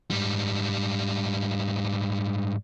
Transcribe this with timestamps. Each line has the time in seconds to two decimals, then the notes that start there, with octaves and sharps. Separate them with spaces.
0.11 G#2 G3